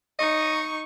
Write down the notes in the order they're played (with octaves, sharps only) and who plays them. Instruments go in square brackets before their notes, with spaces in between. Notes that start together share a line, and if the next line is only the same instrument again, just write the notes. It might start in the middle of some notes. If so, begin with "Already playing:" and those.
[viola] D#4 C#6 [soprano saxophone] D#5